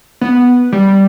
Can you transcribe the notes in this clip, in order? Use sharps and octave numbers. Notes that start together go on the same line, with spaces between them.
B3
G3